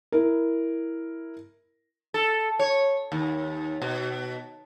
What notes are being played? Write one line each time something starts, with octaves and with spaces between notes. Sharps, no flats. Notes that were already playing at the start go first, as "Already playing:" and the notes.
E4 A#4
A4
C#5
D#2
B2